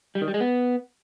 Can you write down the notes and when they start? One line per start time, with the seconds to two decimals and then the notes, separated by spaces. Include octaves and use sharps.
0.15 G3
0.22 D#3
0.28 G3
0.34 G#3
0.40 B3